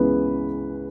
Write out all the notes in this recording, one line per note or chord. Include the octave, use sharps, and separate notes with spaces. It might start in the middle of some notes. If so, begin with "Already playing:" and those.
Already playing: C#2 C#3 E3 B3 B4